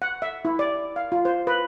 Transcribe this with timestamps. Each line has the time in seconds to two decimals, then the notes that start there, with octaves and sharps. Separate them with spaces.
0.02 F#5
0.22 E5
0.45 E4
0.59 D5
0.96 F5
1.12 F4
1.25 C5
1.47 B4